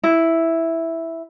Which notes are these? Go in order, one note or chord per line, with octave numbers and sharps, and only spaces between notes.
E4